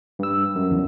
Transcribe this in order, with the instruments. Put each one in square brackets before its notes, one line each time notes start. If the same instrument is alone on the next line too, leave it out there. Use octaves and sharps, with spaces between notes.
[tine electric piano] G2 E6
F#2
[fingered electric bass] E2 E3